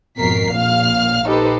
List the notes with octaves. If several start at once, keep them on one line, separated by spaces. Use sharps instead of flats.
G#1 F2 B2 A#4 B6 C7
A#1 A#2 F5 F6
D#4 G4 A4 B4 C5